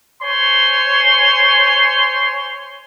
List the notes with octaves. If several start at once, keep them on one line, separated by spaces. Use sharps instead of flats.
C5 C#5 G#5 C6